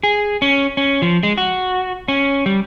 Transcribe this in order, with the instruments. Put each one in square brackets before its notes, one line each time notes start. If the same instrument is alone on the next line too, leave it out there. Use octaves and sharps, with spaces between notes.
[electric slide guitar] G#4
C#4
C#4
F3
G#3
F#4
C#4
G3